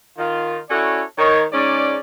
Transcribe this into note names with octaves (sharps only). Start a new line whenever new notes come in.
D#3 F4
C#4 E4 F#4 A4 C#5 D5
D#3 C#5
G#2 C#4 D5